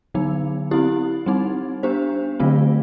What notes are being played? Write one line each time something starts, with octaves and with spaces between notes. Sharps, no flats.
D3 F#3 B3 D#4
C4 E4 G4
G3 C4 D#4
B3 D4 G4 C5
D3 F#3 A3 C4 F4